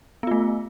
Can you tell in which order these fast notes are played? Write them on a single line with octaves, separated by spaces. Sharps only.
B3 F4 A3